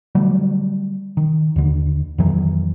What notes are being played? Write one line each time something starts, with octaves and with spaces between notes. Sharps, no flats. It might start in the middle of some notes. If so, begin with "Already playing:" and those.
D3 F#3 G3 A3
D#3
D#2 D3
F2 D#3 E3 F#3